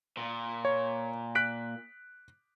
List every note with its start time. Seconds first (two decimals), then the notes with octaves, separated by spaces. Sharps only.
0.17 A#2
0.65 C#5
1.35 F#6 B6 D7